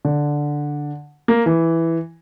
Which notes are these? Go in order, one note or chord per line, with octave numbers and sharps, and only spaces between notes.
D3
A#3
E3